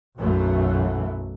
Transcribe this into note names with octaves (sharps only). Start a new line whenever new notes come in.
B1 F#2 E3 A3